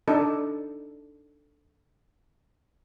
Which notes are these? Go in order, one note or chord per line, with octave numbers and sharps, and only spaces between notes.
D4 D#4 A4